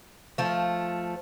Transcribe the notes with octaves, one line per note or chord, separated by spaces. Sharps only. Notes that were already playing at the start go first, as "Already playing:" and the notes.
F3 A3